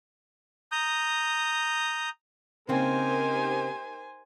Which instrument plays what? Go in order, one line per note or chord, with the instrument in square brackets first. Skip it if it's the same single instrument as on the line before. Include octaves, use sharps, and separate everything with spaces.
[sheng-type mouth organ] A#5 D#6 G6
[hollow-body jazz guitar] C#3 A#3 C4 [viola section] D#4 G4 A#4 [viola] C5 G#5